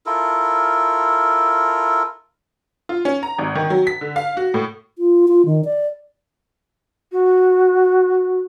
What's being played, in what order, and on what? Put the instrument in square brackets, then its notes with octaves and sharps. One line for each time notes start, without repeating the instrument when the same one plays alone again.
[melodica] E4 F4 A4 A#4
[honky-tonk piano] F4
C#4
A#5
G#1
D#3
F#3
B6
D3
F5
F#4
A2
[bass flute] F4
F4
D#3
D5
[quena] F#4